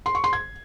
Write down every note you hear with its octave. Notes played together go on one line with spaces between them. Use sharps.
C6
C#6
C6
G#6